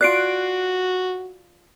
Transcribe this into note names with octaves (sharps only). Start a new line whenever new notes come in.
F4 F#4 D5 F#6 C7 D7